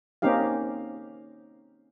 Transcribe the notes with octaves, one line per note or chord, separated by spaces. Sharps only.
A#3 C4 C#4 D#4 G4 F5